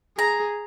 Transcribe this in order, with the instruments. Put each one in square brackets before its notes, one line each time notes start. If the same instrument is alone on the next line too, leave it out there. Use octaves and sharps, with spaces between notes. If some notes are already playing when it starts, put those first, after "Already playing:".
[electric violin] G#4 [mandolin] A#5